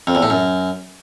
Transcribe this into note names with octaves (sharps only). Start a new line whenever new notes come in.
F2
E2
A2
F#2